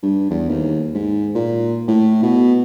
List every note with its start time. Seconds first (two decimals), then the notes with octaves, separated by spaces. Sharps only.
0.02 G2
0.30 E2
0.49 D#2
0.95 G#2
1.35 A#2
1.88 A2
2.22 B2